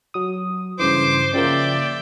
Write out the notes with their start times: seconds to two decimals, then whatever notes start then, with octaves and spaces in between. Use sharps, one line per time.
0.14 F#3 D#6
0.79 G2 C#3 E3 C5 D6
1.34 C#3 F3 A#3 D5 E5 G5